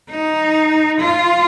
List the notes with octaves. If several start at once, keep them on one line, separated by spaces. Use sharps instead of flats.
D#4
F4